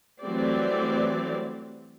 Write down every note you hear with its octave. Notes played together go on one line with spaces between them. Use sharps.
E3 F#3 G3 A3 C4 D5